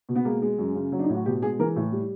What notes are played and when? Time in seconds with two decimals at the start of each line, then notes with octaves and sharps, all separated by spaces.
0.09 B2
0.15 B3
0.25 G#3 A#3
0.42 G#3
0.58 F#2
0.75 C#3
0.92 F#3
0.99 D4
1.03 D#4
1.09 A2
1.15 F#4
1.26 B2 G4
1.42 G#3 G#4
1.59 E3 A#4
1.76 A2
1.92 G3